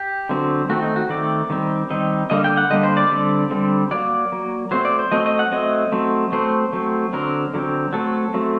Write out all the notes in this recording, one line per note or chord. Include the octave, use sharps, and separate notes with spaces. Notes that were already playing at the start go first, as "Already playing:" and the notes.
Already playing: G4
D3 F#3 C4
D#3 A3 C4 F#4
D#4
F#4
D#3 A3 C4 D5
D#3 G3 C4
D#3 G3 C4 D#5
D3 G3 A#3 D#5
G5
F#5
D3 G3 A#3 D#5
C5
D5
D3 G3 C4
D3 G3 C4
F#3 A#3 D5
F#3 A#3
F#3 A3 C4 C5
D5
C5
F#3 A3 C4 D#5
D#5
F#5
F#3 A3 C4 D#5
F#3 A3 C4
F#3 A3 C4 C5
F#3 A3 C4
D3 F#3 C4 A#4
D3 F#3 C4
F#3 A3 C4 A4
F#3 A3 C4